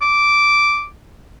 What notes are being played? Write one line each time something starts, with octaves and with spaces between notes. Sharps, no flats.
D6